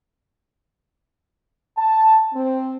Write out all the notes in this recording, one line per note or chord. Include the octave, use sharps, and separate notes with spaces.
A5
C4